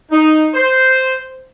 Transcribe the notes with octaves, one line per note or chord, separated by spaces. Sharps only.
D#4
C5